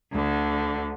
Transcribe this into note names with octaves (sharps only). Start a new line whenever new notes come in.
D2 D3